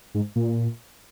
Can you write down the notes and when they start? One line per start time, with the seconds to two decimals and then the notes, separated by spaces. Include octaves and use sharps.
0.15 G#2
0.36 A#2